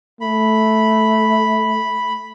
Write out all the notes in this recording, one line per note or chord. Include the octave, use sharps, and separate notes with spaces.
A3 B5